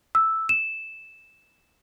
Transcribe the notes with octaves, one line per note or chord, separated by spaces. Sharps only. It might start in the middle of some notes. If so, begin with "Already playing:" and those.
E6
E7